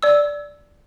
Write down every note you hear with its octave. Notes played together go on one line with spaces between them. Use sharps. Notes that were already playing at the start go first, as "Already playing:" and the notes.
D5 E6